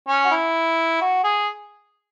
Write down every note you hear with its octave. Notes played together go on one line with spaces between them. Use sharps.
C#4
F#4
E4
F#4
G#4